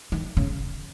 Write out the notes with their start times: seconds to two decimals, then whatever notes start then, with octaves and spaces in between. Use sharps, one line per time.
0.12 D#3
0.37 C#3